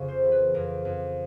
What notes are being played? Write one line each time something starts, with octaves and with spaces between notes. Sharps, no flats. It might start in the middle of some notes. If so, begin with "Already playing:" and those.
Already playing: F2 C#3
C5
E3
B4
F2 A#4
F2